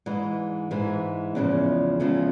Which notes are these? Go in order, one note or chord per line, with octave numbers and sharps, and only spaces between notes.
G#2 E3 G#3
G#2 E3 G#3
E2 C#3 F3 G#3
E2 C#3 F3 G#3